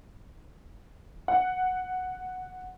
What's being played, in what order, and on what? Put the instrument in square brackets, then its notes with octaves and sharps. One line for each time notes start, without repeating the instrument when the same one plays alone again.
[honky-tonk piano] F#5